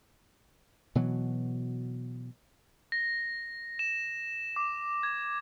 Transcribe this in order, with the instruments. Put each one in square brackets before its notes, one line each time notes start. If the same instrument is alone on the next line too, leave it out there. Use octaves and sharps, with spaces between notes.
[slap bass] B2 E3 F#3
[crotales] A#6
E7
D6
G#6